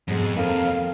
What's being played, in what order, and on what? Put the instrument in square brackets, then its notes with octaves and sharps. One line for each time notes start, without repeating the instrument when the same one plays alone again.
[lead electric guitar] F2 [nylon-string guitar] G#2 B2 G#3
[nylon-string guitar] D#2 C3 [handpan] C4 A4 A#4 [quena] F5